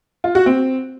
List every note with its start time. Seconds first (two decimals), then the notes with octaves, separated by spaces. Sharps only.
0.24 F4
0.35 F#4
0.46 C4